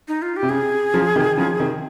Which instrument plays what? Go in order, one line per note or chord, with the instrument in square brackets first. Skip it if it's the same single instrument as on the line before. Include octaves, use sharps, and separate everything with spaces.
[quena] D#4
F4
G4
[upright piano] C3
[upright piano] C#3 [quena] G#4
[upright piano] C#3 F3
C3 D#3
C#3 F3
C3 D#3